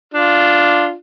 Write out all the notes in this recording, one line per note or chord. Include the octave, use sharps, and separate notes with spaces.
D4 F4